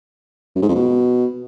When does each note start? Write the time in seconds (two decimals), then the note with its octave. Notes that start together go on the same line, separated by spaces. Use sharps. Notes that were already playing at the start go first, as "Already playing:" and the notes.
0.56 F#2
0.62 G#2
0.69 F2
0.75 B2